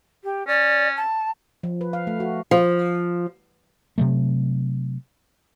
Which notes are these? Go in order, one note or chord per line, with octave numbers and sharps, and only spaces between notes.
G4
C#4 D5
A5
F3
B4
F5
A3
F#4
F3
C3 F#3 A3